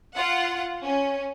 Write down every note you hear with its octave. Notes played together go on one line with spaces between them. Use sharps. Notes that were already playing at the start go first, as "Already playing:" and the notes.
F4 F#5
C#4